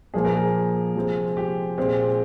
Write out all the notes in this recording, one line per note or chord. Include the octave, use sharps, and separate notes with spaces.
A#2 F3 A#3 G#4
A#4
G#4
C3 F3 G#3 C4
G4
A#2 G#3 C4